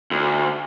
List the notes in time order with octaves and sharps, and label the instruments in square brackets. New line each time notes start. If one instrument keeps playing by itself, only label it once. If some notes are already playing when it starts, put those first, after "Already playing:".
[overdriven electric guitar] D2